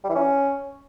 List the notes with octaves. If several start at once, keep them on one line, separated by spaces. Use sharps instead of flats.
G3
E3
C#4